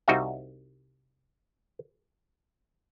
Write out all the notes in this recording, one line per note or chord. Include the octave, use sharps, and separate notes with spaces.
C2 G3 D#4 F#4 E5 F5